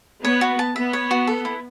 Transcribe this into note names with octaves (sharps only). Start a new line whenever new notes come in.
B3 C#5
F#4
A5
B3 E5
C#5
F#4
A4
E4